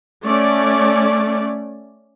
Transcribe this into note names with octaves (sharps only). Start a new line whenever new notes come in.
A3 C#4 D5